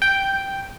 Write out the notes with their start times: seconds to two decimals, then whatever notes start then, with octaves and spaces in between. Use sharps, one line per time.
0.02 G5